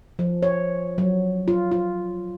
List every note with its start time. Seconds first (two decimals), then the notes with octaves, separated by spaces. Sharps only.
0.19 F3
0.43 C#5
0.98 F#3
1.48 F4
1.71 F4